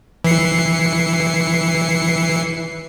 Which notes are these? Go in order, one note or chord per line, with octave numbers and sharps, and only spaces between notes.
E3 C7 C#7